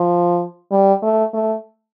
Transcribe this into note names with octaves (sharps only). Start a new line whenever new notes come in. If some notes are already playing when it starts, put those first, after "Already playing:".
Already playing: F3
G3
A3
A3